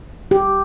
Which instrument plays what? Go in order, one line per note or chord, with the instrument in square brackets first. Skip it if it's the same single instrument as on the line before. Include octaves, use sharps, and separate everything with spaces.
[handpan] G4